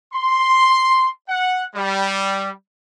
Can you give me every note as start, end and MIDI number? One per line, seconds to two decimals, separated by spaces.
0.13 1.08 84
1.29 1.65 78
1.75 2.50 55